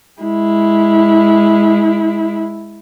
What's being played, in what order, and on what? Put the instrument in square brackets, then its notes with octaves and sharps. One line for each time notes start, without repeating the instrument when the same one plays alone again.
[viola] G#3 E4